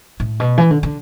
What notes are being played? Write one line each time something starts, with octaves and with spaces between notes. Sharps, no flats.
A2
B2
E3
D3
D3